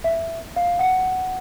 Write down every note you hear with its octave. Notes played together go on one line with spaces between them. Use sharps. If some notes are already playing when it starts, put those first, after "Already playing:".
E5
F5
F#5